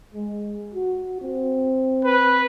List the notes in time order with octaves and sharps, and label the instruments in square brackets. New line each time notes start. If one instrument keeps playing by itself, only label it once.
[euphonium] G#3
F#4
C4
[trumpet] B4